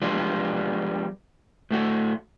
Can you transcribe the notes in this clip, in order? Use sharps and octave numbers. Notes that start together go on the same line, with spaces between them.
F3 G3 G#3 B3 D4 F4
A2 A3 F#4